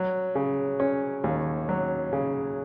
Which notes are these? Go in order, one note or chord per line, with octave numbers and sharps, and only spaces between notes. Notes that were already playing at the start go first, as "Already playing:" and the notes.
Already playing: F#3
C#3
C#4
D#2
F#3
C#3